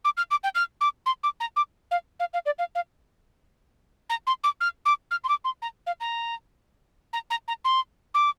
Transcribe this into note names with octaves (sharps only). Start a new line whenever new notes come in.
D6
F6
D6
G5
F6
D6
C6
D6
A#5
D6
F5
F5
F5
D5
F5
F5
A#5
C6
D6
F6
D6
F6
C6
D6
C6
A#5
F5
A#5
A#5
A#5
A#5
C6
D6